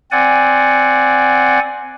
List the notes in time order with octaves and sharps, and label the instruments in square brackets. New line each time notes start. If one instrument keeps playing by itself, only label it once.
[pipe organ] C4 D5 F#5 G#5